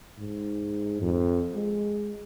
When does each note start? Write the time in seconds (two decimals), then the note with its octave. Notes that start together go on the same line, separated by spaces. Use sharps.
0.18 G#2
1.02 F2
1.55 G#3